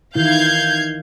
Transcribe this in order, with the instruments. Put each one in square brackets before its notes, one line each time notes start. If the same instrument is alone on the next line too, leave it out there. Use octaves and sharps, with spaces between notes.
[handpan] D#3 E3 E4 [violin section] F5 G6 G#6